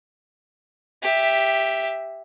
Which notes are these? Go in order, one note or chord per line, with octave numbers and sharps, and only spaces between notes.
G4 E5